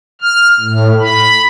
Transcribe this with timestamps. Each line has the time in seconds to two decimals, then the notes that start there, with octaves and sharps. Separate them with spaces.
0.21 F6
0.60 A2
1.00 B5